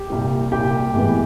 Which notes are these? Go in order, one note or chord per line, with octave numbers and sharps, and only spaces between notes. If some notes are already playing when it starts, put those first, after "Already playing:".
Already playing: G4
C2 A#2 G3
C2 A#2 G3 G4 G5
A2 E3 G#3 B3